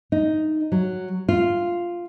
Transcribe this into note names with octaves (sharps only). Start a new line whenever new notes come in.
D#4
F#3
F4